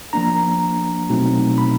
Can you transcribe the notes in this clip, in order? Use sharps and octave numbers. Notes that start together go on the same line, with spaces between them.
F3 A#3 D4 A#5
B2 F#3 A3 C4 D#4
B5